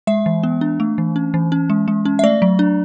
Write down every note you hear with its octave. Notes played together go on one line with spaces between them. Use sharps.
G#3 E5
E3
B3
D4
A3
E3
C#4
E3
C#4
G#3
G#3
C#4
E5
A3 D5
F#3
D4